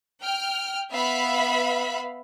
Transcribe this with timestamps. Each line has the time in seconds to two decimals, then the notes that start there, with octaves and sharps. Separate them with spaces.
0.21 G5 F6
0.91 B3 E5 F5 B5